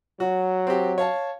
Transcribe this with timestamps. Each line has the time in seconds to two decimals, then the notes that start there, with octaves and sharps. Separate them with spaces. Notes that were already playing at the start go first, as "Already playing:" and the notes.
0.20 F#3 F#4
0.67 C4 G4
0.98 C#5 F5 A5